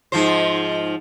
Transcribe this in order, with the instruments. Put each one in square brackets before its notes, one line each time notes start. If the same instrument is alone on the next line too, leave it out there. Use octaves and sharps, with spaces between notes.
[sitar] G#2 F3 C5